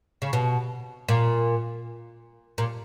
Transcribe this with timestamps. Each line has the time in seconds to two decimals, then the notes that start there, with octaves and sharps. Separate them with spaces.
0.22 C#3
0.33 B2
1.09 A#2
2.58 A#2